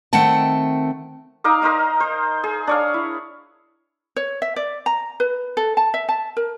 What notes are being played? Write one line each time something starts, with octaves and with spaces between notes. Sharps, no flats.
D#3 A3 C4 F#5 G5 A5
D#4 D#5 F5 D6
A#4 C5 D#5 F5
C5
G#4
D4 C#5 F5
E4
C#5
E5
D5
A#5
B4
A4
A5
E5
A5
A#4